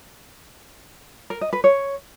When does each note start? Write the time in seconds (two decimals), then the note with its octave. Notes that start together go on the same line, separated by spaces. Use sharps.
1.30 A#4
1.41 D#5
1.53 B4
1.64 C#5